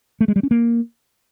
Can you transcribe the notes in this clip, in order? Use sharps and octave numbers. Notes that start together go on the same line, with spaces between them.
A3
G#3
G3
C#4
A#3